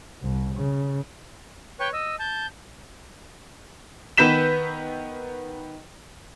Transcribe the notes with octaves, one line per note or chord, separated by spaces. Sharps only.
C2
C#3
B4 C#5 G5 C#6
D#5 E6
A5 G6
D#3 B3 B4 G6 B6 E7